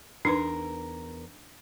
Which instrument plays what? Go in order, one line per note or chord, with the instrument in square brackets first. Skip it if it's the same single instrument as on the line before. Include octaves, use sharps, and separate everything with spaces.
[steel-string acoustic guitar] E2 A#4 [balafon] D4 D#4 B4